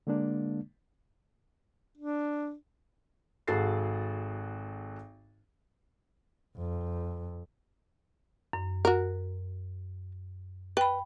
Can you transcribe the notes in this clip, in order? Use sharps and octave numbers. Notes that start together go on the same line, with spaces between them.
D3 G#3 A#3 D4
D4
G#1 F#4 G#4 A4 A6 C7
F2
F#2
F#4 A#4
B4 G5 B5